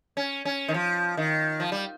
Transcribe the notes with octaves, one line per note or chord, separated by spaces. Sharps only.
C#4
C#4
D#3
F3
D#3
F3
G3